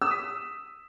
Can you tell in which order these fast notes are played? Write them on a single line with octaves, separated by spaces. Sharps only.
E6 D#6 B6